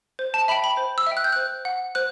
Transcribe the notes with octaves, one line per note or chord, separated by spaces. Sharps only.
C5
A5
E5 G5 B5
B5
C5
E6
E5 G5
F#6
G6
C5 F#6
F#5
C5 F#6